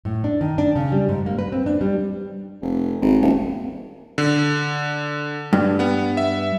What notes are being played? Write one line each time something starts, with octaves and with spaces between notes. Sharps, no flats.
A2
D4
D#3
D4
C#3
G3
G#2
A#3
B4
C4
D4
G3
F1
G#1
D#1
D3
G2
B3 F#5
E5